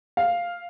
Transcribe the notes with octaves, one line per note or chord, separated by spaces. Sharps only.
F5